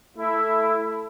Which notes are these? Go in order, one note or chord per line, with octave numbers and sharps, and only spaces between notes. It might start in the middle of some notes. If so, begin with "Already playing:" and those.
A3 E4